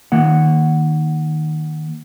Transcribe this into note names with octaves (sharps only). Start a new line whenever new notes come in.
D#3 A#3 F#5